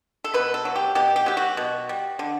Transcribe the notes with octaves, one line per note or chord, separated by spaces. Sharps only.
A4
B2 B4
A4
F#3
G4
B2 G4
G4
F#3 G4
F#4
B2
G3
D3